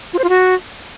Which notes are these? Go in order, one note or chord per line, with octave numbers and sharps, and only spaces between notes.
F4
C5
F4
F#4